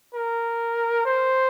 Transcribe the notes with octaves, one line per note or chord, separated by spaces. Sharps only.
A#4
C5